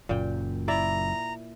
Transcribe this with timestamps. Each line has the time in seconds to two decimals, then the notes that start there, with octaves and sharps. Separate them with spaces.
0.09 F#1 F#2 A#2 G5
0.68 E4 D5 A#5